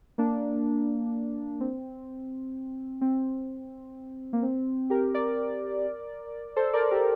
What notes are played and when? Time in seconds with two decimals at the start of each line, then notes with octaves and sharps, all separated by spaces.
0.18 A#3 D4
1.60 C4
3.01 C4
4.33 A#3
4.43 C4
4.90 G4 A#4
5.14 A#4 D5
6.56 A4 C5
6.73 A#4 D5
6.91 G4 A#4